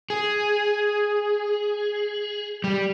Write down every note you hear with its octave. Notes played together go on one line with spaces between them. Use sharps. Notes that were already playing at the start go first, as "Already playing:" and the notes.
G#4
G3